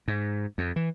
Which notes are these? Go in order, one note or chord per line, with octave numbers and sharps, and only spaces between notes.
G#2
F2
E3